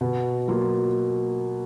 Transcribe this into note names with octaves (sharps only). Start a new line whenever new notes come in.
B2
F#3 A#3 F4